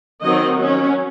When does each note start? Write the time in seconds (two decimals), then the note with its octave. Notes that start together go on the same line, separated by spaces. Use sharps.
0.21 D#3 F#3 C4 D#5
0.57 F#3 C#4